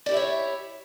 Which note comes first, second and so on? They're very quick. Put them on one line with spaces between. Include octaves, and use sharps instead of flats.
D5 G4 E4 E5 C#5